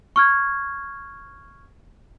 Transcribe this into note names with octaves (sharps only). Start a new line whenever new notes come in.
C#6 F6 G#6